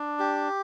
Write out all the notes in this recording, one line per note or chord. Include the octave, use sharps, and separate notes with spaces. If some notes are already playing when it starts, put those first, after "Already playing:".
Already playing: D4
G4